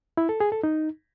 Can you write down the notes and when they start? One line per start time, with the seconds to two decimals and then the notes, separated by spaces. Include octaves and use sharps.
0.17 E4
0.29 A4
0.40 G#4
0.52 A4
0.63 D#4